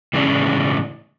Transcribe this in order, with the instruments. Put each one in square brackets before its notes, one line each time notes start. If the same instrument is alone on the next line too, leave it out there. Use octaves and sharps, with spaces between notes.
[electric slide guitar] A2 C#3 E3 G#3 C#4 D4